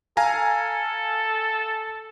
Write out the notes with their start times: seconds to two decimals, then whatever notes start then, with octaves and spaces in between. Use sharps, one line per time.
0.17 A4 F5 G#5 A#5